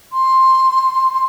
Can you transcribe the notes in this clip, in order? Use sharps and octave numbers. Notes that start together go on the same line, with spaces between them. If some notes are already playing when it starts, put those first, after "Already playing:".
C6